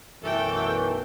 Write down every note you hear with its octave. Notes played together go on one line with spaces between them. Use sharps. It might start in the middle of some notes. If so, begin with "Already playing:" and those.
B1 F#2 E3 A3 A4 G5